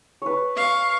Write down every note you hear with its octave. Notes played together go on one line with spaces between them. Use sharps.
B4 C#5
F5 C#6